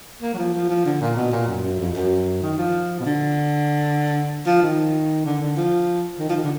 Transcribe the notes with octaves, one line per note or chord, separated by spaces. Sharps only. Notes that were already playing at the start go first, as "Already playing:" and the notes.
A#3
F#3
F3
F3
F3
D3
A#2
B2
A#2
F#2
F#2
F2
F#2
D#3
F3
B2
D3
F3
D#3
D3
D3
F3
D#3
F3
D#3
D3